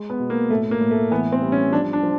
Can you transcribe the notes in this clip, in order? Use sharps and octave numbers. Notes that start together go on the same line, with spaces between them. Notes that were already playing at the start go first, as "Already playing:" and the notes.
Already playing: G#3
B3
B2
A#3
A2 A3
A#3
A2
A3
E3 B3
C4
G3
C#4
F3 D4
D4
F3